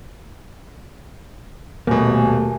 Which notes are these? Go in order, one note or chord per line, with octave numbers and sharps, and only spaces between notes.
D#1 B2 A3 A#3 G#5